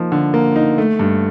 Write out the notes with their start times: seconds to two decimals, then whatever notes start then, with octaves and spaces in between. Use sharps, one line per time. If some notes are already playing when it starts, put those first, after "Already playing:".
Already playing: F3 A#3 D#4
0.12 D3
0.34 A#3
0.56 D#4
0.78 A3
0.99 G2